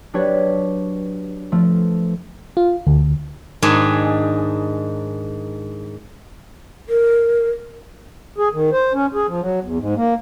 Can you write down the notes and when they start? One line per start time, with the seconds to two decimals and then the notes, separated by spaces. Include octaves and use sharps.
0.13 F#3 D4 G4 B4 C#5
1.52 F3 A3
2.57 F4
2.87 D2
3.62 G#2 D#3 D4 G#4
6.89 A#4
8.38 G#4
8.53 D#3
8.72 C5
8.94 C#4
9.14 G#4
9.28 F3
9.41 F#3
9.62 E2
9.79 G#2
9.96 A#3